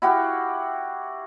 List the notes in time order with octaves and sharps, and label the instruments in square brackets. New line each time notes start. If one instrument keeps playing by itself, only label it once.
[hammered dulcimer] E4 F#4 G4 F5